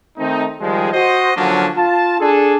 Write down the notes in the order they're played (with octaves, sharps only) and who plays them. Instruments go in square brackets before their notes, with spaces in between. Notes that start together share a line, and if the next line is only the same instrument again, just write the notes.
[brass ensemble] D#3 A3 C4 D#4
D#3 F3 G3 G#3
F#4 C5 D#5
D3 F3 F#3 A#3 C#4 D4
F4 A5
D4 G#4 A4